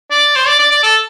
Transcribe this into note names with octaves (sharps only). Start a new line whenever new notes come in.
D5
C5
D5
D5
D5
A4